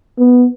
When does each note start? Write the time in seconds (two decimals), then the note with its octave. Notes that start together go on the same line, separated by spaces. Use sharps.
0.18 B3